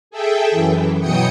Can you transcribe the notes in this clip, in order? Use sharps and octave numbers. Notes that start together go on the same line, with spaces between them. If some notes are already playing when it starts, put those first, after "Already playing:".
G#4 A4 E5 G5
F#2 E3
B2 E3 F#3 G5 D#6 C#7